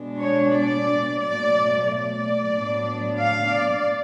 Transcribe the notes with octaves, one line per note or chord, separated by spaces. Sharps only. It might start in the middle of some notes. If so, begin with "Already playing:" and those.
Already playing: B2 G#3 B3 D4
C#5
D5
B2 F#3 A3 D5
D5
A2 F#3 B3 D4
F5
D5